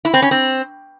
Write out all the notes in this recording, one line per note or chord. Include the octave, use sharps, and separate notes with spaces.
E4
C4
C#4
C4